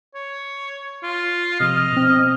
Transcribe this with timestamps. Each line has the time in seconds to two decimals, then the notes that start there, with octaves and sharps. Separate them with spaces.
0.15 C#5
1.03 F4
1.60 C3 F3 D#5 F6
1.92 B2 C4